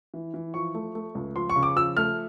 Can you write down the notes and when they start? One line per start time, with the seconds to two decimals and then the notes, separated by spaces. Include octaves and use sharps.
0.14 E3
0.34 E3
0.54 F3 C#6
0.74 A3
0.95 A3
1.15 C#2
1.36 F3 C6
1.50 C#6
1.56 C#3
1.63 D6
1.76 F3 E6
1.97 A3 F6